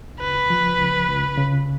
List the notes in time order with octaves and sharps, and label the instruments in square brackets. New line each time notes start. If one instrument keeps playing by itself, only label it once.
[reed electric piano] C#2 [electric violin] B4
[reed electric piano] F3
C#2
C#2
C#3